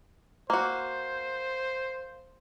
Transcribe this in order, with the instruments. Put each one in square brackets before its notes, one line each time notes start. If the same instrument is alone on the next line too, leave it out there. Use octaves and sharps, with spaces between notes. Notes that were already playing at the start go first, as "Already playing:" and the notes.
[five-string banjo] A#3 F#4 [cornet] C5